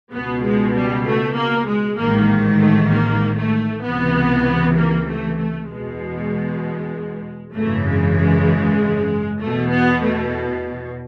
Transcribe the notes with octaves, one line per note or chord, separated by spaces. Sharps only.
C#2 B2 B3
G#3
G3
A3
A#3
G#3
A1 G#2 D#3 A#3
A3
A#3
A3
C#2 C3 E3 B3
A#3
A3
A3
E2 B2 G#3
G#1 F#2 C#3 E3 A3
G#3
G#3
E2 B2 A3
B3
A3